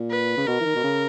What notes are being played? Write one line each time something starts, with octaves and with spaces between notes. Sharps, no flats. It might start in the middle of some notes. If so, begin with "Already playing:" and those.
Already playing: A#2
B4
C#3
B2 A#4
E3
D#3
B2
C#3